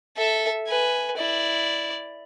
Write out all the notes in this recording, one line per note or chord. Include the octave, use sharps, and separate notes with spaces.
A4 E5
B4 G#5
E4 D5